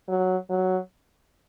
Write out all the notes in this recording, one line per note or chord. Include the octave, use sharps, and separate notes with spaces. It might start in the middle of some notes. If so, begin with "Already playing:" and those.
F#3
F#3